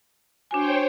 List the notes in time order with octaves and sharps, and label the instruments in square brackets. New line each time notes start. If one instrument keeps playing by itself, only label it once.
[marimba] D4 F#4 G#5 [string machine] C5 C#5 G5